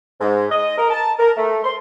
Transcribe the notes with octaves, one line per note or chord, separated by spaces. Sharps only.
G#2
D#5
A#4
A5
A#4
A3
C6